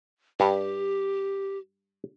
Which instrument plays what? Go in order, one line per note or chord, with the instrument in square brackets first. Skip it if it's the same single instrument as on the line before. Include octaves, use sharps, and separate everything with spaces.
[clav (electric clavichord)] G2 [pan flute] G4